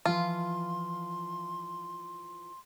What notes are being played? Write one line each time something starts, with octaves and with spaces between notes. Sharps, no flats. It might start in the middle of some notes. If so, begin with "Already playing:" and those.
E3 F3 F4 F5 C6